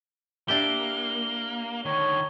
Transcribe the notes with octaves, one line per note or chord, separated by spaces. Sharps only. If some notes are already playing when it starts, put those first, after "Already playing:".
A#3 D4 E4 G4 G7
D3 D#3 C#5